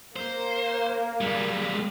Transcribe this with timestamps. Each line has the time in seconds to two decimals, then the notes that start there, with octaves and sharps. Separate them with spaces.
0.16 A#3 A#4 C5
1.21 G3 G#3